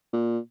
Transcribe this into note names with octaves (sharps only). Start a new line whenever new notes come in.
A#2